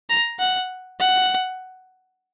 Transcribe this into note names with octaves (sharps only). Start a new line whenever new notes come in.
A#5
F#5
F#5